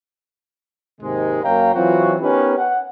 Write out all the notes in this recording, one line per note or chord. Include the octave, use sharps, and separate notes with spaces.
D#2 G#2 C3 D#3 G#3
F#2 A#3 C#5 F5 G5 A#5
E3 F#3 C4 F4 F#4
B3 C#4 D#4 G4 A#4 B4
F#5